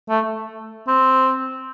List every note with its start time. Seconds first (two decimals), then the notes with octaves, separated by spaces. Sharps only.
0.09 A3
0.88 C4